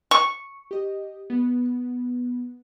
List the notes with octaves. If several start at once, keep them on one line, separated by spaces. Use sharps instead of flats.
C#6
G4 D#5
B3